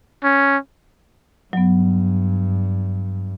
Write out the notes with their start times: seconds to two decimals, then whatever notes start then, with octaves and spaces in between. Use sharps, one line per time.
0.23 C#4
1.53 G2 F#3 B3